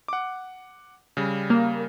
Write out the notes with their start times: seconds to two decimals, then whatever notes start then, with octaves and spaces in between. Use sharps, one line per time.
0.08 F#5 D6
1.17 C#3 G3
1.50 A#3